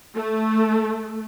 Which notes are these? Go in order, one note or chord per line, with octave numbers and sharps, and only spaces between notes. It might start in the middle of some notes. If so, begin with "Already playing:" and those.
A3